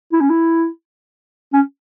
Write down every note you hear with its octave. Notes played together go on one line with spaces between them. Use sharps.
E4
C#4
E4
C#4